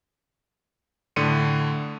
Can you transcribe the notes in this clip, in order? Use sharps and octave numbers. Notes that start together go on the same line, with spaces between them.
A2 D3 C6 C#7 D#7